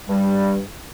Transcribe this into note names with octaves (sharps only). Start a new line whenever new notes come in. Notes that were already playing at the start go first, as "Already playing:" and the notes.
G2 G3